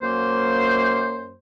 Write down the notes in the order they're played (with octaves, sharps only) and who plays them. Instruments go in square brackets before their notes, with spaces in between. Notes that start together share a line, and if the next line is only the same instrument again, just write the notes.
[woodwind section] F#2 A#3 C5